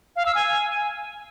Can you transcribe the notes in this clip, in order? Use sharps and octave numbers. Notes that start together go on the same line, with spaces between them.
F5
E6
G#5